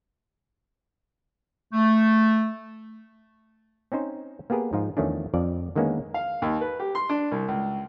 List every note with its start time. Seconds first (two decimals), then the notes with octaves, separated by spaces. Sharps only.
1.73 A3
3.92 C4 C#4 D#4 C5
4.50 A#3 B3 G4 G#4 A#4 B4
4.73 G#2 F3 D#4 F4
4.97 E2 D#3 F3 A3 C#4 D4
5.34 F2 F3 D5
5.76 D3 D#3 G#3 A#3 B3 C#4
6.14 F5
6.42 D#2
6.61 B4
6.80 G4
6.95 C6
7.09 D4
7.31 C2
7.48 C#2